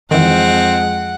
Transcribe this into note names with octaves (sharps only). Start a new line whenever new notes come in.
F2 D#3 E3 G#3 C4 F#5